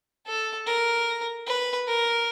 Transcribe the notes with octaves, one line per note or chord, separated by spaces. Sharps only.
A4
A#4
B4
A#4